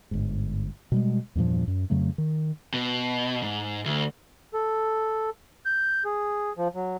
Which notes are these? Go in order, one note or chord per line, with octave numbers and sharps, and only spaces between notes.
G1 G#2
B2 G3 G#3
E2 G2 A#2 F3
F#2
F2 C#3 F#3 A3
D#3
B2
G#2
D2
A4
G6
G#4
F3
F#3